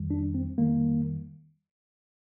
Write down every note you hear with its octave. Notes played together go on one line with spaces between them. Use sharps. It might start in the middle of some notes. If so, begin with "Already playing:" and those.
Already playing: F2 D#3 G3
D4
C4
F2 D#3 G3 A#3